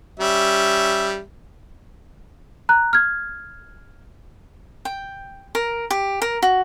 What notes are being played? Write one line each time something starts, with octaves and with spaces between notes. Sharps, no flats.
G3 C#4 E5
A#5 F#6
F6 G#6
G5
A#4
G4
A#4
F#4